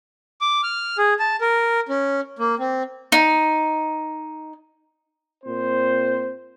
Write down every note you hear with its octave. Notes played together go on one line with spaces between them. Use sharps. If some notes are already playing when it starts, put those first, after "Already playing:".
D6
F6
G#4
A5
A#4
C#4
A#3
C4
D#4
A#2 C4 C5